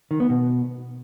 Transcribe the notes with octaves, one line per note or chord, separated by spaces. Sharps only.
D#3
B3
B2